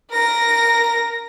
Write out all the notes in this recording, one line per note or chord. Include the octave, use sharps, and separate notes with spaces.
A#4 A#6